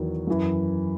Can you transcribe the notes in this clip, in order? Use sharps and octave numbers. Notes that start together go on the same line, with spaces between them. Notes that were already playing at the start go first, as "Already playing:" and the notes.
Already playing: E2 D#3 F#3
F#2 E3